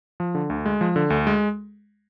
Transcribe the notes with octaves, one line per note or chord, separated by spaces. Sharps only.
F3
D3
D2
G#3
F3
D3
D2
G#3